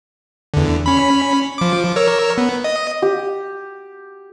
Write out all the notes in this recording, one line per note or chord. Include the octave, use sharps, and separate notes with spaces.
E2 D3
C#4 B5
F3 D6
A#4 C#5 E6
B3
D#5
G4